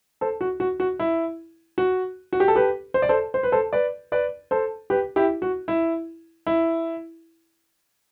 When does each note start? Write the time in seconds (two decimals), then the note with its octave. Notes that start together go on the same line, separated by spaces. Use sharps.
0.21 A4 C5
0.41 F#4
0.60 F#4
0.80 F#4
1.00 E4
1.78 F#4
2.33 F#4
2.40 G4
2.48 A4
2.56 G4 B4
2.94 C5
3.02 D5
3.09 A4 C5
3.34 C5
3.43 B4
3.52 A4 C5
3.73 B4 D5
4.12 B4 D5
4.51 A4 C5
4.90 G4 B4
5.16 E4 G4
5.42 F#4
5.68 E4
6.47 E4